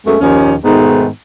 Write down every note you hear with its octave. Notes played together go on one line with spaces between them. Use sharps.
F#2 G#3 A3 B3 C#4
D#2 A#2 F3 C#4
G#2 B2 D#3 A3 B3